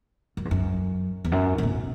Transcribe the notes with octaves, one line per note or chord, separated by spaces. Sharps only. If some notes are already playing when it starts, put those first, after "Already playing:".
F#2
E2
F#2
E2
F#2
A2
B2